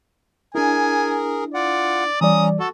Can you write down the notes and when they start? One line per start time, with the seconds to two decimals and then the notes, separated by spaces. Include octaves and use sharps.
0.55 D4 E4 G#4 A#4 G#5
1.54 F4 D5 F#5
2.21 E3 G3 C#4 D5 A#5 D#6
2.60 F#4 A4